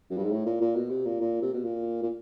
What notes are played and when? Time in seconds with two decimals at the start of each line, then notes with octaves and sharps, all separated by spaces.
0.10 F#2
0.17 G2
0.24 G#2
0.32 A2
0.46 A#2
0.61 A#2
0.75 B2
0.90 C3
1.06 A#2
1.21 A#2
1.42 C3
1.53 B2
1.64 A#2
2.03 A#2